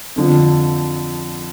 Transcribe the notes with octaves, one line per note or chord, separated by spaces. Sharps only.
F2 D3 F3